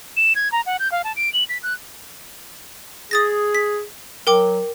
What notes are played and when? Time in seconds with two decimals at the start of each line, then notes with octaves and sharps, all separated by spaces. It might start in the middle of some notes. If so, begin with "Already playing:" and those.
0.17 E7
0.36 G#6
0.52 A#5
0.66 F#5
0.79 G6
0.92 F5
1.04 A5
1.16 D7
1.33 F#7
1.49 B6
1.63 F#6
3.11 G#4 D#6 A6 A#6
3.54 B6
4.27 F#3 A#4 G5 D6